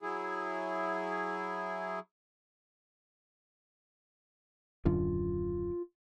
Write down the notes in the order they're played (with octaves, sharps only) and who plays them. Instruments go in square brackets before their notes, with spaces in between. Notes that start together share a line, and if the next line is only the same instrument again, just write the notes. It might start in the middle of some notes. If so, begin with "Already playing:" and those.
[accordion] F#3 E4 G#4
[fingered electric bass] D#1 F#2 D3 [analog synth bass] F4